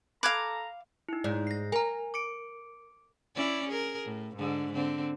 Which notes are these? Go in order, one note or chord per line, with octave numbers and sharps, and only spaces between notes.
A4 F5 A#5 B5 D6 F#6 G#6
D#4 E4
G#2 D5
A#6 C7
A#4 G#5 A#5
D6 C#7 D7
C#4 E4 D5
G#4 A#4
A2
G#2 D3
D3 C4